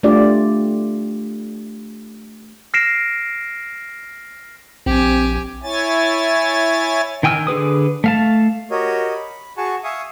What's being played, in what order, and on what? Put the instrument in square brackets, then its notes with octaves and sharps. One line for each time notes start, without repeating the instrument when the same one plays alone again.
[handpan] A3 D4 F4 G4 D5
[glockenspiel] F6 A#6 C7 D7 E7
[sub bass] A#1 [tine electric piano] C4 [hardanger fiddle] G4 G#5
[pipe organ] E4 C#5 G#5 A6
[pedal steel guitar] D#3 G5 G#5 E6 F6
D3 G#4 B4 D#6
A3 F5 A5
[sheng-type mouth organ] F#4 G4 A#4 C#5 D#5
B5
F#4 G#4 F#5 G#5 A5 C#6
E5 F5 G#5 C#6 D#6